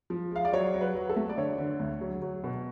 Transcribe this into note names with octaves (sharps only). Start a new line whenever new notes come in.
F3
G#3 F5
D5
F#3 C#5
F#3
B4
F#3
A4
A3
D5
D3 C#5
D3
D2
F#3
F#3
B2